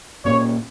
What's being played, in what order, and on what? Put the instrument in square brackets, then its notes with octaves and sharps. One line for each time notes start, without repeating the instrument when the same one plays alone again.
[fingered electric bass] A#2 A#3 C#4 [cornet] C#5